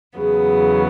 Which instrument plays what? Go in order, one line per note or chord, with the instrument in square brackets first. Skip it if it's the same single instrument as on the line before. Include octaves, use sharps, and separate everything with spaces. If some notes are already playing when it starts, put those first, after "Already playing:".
[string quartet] E2 C#3 F#3 B3 [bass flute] G#4